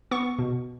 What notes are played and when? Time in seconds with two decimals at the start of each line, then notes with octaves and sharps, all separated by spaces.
0.11 B3 C#6
0.39 B2